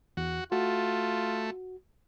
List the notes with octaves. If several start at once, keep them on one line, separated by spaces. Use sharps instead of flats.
E2 F#4
A3 F4 F#4